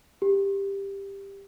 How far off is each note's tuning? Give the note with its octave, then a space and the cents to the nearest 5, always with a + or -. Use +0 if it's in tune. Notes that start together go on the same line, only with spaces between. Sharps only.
G4 +10